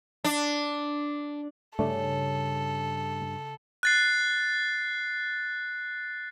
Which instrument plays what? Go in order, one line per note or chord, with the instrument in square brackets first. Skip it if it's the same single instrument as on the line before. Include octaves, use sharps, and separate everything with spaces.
[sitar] D4
[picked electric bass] G2 [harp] C#3 [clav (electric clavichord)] A3 D4 [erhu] A4
[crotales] F#6 A6 C7